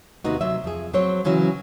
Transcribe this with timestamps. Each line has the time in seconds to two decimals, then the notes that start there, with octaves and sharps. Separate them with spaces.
0.24 D#2 C3 B3 D#4 F#4
0.41 C3 F#3 E5
0.64 F2 G#4
0.94 F#3 C4 C#5
1.25 C#3 E3 F#3 C#4 F#4